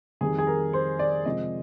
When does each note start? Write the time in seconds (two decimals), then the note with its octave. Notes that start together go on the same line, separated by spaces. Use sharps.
0.21 F2 D#3 G3 G#4
0.38 G#4
0.47 A#4
0.73 C5
0.99 D5
1.26 C3 F3 G#3 D#5